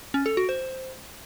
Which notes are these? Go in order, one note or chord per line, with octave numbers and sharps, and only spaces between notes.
C#4
A4
F#4
C5